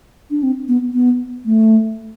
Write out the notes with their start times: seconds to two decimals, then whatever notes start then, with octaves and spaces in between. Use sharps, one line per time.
0.31 D4
0.43 C4
0.68 B3
0.94 B3
1.45 A3